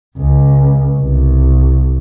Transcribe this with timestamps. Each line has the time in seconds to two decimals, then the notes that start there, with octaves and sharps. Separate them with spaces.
0.18 C#2
0.98 C2